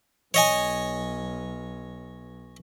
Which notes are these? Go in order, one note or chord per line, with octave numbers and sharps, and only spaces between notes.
B1 C#5 D#5 G#5